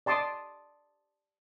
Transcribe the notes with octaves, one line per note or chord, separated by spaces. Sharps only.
D5 A5 C6 D6 D#6